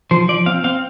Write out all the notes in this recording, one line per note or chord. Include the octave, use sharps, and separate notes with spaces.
F3 C5
F3 D5
C4 F5
C4 F5